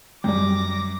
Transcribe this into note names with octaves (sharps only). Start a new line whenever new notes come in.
F#2 G3 G5 D6 A#6